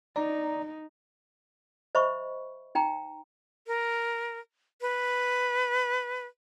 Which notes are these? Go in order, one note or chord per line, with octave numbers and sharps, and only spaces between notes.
D#4 D5 A#5
C5 D#5 E5 B5 C#6
D#4 G5 A#5
A#4
B4